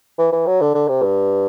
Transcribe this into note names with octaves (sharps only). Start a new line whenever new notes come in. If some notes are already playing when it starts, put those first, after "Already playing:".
E3
E3
F#3
D3
D3
C3
G2